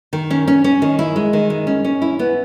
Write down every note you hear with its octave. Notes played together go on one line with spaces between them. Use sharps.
D#3
C#4
C#4
C#4
D#3
E4
G#3
D#3
G#3
C#4
C#4
E4
B3